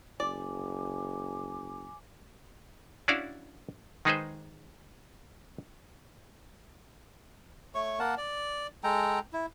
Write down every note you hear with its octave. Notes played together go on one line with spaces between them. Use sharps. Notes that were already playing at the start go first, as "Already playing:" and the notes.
F#1 D5 G#5 D6
C#4 D4 E4 F#4 D5 F5
D#3 G#3 D#4 G#4 B4 C5
A3 C#5 C#6
A#3 A#4 F#5 A5
D5
G#3 A4 G5 A#5
E4